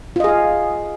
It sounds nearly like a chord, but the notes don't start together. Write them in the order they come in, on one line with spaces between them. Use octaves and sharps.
F4 D#5 G#4 F5